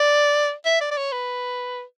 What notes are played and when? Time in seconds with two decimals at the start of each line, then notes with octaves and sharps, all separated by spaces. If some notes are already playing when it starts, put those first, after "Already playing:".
Already playing: D5
0.65 E5
0.81 D5
0.91 D5
0.97 C#5
1.12 B4